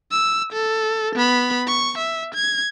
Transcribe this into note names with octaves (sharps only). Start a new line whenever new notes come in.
E6
A4
B3 B5
C#6
E5
G#6